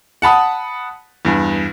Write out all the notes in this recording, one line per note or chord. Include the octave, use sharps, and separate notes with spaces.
F#5 A5 B5 D#6
E2 G2